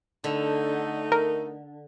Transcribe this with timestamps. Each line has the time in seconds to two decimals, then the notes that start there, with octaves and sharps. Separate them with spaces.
0.24 D3 A3 D#4
1.12 A#4